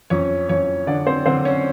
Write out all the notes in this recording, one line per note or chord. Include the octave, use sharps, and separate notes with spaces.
F2 C#4 C#5
F2 C#4 C#5
D3 D4 D5
C4 C5
D3 C4 C5
C#4 C#5